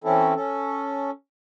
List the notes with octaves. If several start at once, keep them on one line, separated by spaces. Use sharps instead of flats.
E3 C4 C#4 E4 A4
C#4 A4